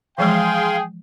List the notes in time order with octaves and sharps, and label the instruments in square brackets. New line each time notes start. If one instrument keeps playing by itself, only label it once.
[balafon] E3 F3 G#3 [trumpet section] G#4 G5 [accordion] F5 C6